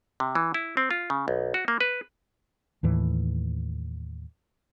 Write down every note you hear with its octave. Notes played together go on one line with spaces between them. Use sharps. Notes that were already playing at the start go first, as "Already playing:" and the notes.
C3
E3
E4
C4
F4
C#3
B1
F#4
A#3
B4
D#2 A2 E3